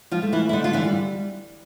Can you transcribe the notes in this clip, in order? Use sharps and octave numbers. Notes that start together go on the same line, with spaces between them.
F3 F4
A3
E3 E4
E4
D3 D#4
F4
E3 E4
G3